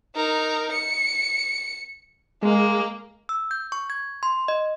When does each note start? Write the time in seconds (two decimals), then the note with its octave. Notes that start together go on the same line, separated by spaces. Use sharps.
0.16 D#4 A#4
0.72 C#7
2.42 G#3 A#3
3.29 E6
3.51 G6
3.72 C#6
3.90 G#6
4.23 C6
4.48 D#5